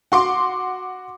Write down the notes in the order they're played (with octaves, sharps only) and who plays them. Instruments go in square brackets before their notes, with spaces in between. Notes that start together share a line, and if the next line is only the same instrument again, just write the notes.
[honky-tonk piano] F#4 C6 D6